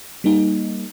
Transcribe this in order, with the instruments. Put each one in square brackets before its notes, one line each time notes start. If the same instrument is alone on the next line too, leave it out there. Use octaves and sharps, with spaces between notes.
[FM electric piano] G3 A#3 D#4